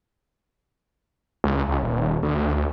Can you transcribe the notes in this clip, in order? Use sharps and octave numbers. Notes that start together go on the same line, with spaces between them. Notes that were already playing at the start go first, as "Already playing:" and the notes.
C#2
C#2
D#1
D2